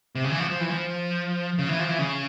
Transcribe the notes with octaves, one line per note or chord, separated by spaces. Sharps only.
C3
C#3
E3
F3
F3
E3
F3
C#3
E3
F3
E3
C#3